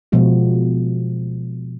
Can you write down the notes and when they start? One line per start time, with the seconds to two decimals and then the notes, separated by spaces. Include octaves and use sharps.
0.12 B2 F3 G#3 F#4